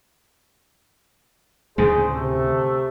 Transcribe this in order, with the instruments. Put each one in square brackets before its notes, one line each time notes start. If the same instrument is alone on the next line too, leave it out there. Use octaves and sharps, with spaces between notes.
[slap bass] D2 A2 C#3 [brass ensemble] G#4 C5
[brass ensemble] C3 A3